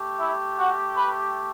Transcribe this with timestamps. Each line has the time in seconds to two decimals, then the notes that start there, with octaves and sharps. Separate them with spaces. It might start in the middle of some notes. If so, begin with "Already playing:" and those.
Already playing: A3 G4
0.19 E4 E5
0.58 F#4 F#5
0.96 B4 B5